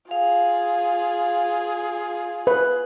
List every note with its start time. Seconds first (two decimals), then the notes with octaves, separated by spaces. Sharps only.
0.11 F4 G#4 F5
2.47 B4